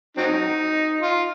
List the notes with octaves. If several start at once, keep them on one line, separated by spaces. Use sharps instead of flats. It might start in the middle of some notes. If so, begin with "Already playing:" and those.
F#3 C4 D#4
F4